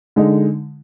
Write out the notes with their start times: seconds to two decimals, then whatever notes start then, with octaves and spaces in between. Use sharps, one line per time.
0.16 D3 G#3 D#4